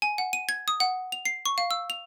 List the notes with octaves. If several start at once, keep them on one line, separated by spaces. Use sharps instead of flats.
G#5
F#5
D#7
G#6
D#6
F#5
F7
C7
C#6
F5
E6
F7